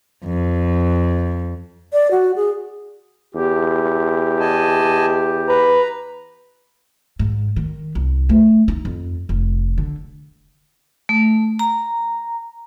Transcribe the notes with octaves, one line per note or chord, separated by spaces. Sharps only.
F2
D5
F#4
G#4
E2 G4
D#5 G#5 A5
B4 A#5
G#2
D#3
C2
A3
D#4
F2
F1
D3
A3
A#5